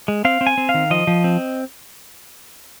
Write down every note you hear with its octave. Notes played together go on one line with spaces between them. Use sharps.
G#3
C4 F5
C4
G#5
C4
F5
D#3
F3 D#5
F3
C4